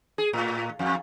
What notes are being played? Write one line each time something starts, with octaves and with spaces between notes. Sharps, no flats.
G#4
A2
F2